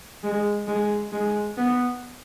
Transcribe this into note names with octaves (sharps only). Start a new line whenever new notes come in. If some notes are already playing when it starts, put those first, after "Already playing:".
G#3
G#3
G#3
B3